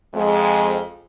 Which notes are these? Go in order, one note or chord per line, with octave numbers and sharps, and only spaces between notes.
F2 G#3